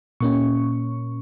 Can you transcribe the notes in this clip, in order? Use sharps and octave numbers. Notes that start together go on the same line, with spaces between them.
A#2 A#3 C#4 C#6